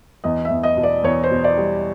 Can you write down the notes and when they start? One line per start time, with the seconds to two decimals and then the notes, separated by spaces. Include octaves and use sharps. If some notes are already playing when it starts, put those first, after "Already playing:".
0.24 E2 D#5
0.45 E5
0.50 E2
0.63 D#5
0.77 B2
0.83 D5
1.03 E2 C#5
1.24 C5
1.31 B2
1.44 D5
1.57 G3